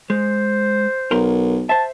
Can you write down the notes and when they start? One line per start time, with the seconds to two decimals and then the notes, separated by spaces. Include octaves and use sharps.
0.10 G#3 C5
1.11 B1 A#4 C6
1.69 C5 E5 A5